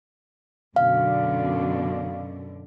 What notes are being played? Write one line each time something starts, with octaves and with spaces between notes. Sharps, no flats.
F#2 B2 D3 F5